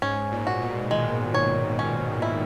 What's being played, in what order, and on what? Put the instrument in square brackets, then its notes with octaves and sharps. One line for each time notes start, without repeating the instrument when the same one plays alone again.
[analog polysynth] G#2 [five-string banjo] C#4
[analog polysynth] A#2
[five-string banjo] F#4
[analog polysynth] B2
[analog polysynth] D#3 [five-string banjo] G#3
[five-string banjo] C#5
C#4
E4